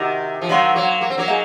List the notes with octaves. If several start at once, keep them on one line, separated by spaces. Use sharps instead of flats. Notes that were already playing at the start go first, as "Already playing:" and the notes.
Already playing: C3 D#3 D#4 F#4 A#4
F3
D#3 F#3 F#4 C5 F5 C6
F#3 A#3
A#3
C4
F#3 A#3
D#4 G#4